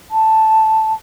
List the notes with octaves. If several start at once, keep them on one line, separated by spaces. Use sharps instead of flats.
A5